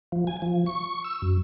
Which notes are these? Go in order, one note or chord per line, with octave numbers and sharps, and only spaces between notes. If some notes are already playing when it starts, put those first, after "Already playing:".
F3
G#5
F3
C#6
E6
F#2